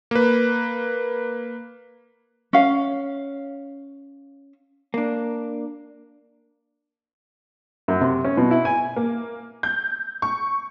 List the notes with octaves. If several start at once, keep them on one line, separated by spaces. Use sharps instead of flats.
A#3 B4
C#4 F5
A#3 D4
F#2
C3
C#4
B2
E4
G#5
A#3
G6
C#6